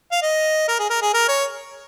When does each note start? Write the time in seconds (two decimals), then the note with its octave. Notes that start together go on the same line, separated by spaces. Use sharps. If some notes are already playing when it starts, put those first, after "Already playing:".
0.11 F5
0.22 D#5
0.68 A#4
0.79 G#4
0.90 A#4
1.02 G#4
1.14 A#4
1.28 C#5